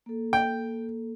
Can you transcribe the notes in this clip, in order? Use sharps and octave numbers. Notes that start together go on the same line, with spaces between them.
A#3 A4
G5